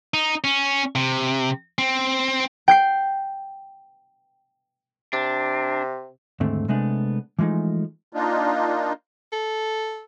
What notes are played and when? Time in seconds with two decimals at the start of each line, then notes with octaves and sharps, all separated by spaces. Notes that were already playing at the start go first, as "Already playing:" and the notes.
0.14 D#4
0.44 C#4
0.95 C3
1.78 C4
2.68 G5 G6 C7
5.13 C3 D4
6.40 D#2 G#2 D3 A3 C4
6.68 C3 G#3 A3 B3 D4
7.39 E3 F3 G#3 A3 D#4
8.13 A#3 D4 D#4 F4
9.33 A4